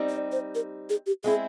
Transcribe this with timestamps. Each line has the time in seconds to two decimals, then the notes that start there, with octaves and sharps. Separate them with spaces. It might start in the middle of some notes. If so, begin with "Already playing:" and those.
Already playing: G3 C4 D#4
0.09 D5
0.32 C5
0.55 A#4
0.90 G#4
1.07 G4
1.24 G#3 C4 E4 G#4